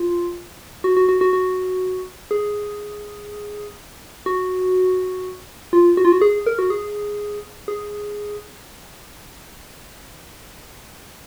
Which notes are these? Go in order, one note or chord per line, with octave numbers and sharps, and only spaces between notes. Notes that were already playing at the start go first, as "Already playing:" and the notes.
Already playing: F4
F#4
F#4
F#4
F#4
F#4
G#4
F#4
F4
F#4
F4
F#4
G#4
A#4
F#4
G#4
G#4